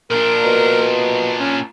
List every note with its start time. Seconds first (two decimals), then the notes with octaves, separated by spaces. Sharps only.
0.11 A#2 D4 A#4
0.44 B2
1.40 C#4